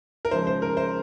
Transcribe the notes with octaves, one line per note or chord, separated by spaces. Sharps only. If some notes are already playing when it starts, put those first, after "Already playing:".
A#4
C#3 F3 G#3 C5
C5
A#4
C5